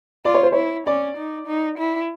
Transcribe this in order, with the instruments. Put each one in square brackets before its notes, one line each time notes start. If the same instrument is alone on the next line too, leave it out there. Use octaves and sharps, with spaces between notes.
[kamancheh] F4 [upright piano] D5
[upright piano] C#5
C5
[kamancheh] E4 [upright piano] C#5
[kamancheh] C#4 [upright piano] D5
[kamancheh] D#4
D#4
E4